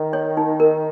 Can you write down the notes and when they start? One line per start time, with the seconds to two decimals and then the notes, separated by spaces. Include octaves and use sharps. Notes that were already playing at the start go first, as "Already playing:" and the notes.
Already playing: D#3
0.13 C#5
0.37 D#4
0.60 A#4